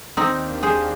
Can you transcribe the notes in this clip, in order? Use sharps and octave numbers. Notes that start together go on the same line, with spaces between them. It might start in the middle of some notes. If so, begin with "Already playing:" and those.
D#2 D#3 A#3 C4 D4 D#4 G4
G#4 C5